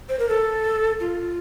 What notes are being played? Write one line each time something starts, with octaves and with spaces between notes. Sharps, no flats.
C5
A#4
A4
F4